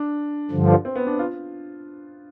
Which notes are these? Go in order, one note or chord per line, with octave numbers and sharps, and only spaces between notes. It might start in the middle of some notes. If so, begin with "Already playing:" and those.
Already playing: D4
G2 D3 F3
C4
B3
D4
F4